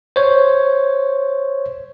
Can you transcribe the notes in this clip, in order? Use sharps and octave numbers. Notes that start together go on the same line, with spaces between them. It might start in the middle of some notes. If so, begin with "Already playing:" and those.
C5 C#5